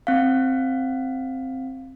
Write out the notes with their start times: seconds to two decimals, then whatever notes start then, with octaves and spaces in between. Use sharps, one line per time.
0.07 C4 F5